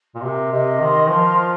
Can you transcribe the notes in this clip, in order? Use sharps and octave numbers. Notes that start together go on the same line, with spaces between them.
A#2
C3 A#4
C3 D#5
D#3 C6
F3 A#4
F4